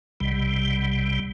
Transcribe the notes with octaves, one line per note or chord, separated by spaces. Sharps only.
B1 C3 G3